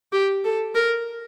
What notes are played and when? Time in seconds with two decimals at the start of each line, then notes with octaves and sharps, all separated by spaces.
0.12 G4
0.45 A4
0.75 A#4